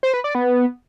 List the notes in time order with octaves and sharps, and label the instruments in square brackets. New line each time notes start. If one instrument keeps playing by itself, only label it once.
[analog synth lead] C5
B4
D5
B3